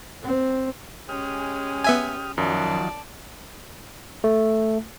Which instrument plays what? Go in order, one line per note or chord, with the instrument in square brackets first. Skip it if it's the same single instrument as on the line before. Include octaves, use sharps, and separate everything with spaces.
[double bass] C4
[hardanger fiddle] G#3 C#4 [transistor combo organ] G4 D#6 F6
[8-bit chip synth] B3 E5 G#5
[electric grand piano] F#2 [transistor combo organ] D#3 F3 F#3 [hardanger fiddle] D5 A5
[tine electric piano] A3